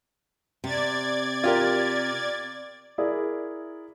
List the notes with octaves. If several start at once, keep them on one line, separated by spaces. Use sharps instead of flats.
C3 D5 G#6 A6
F4 G4 A#4
E4 G#4 A#4 D5